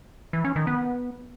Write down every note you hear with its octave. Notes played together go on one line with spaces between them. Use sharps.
E3
C#4
D#3
B3